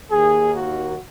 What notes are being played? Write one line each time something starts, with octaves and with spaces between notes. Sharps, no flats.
D#2 D#3 A#3 G#4
F#4